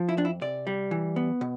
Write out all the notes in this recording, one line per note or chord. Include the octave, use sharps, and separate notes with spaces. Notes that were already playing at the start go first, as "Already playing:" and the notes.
Already playing: F3
E4
F2 D4
E4
C3 D5
G3
E3
B3
B2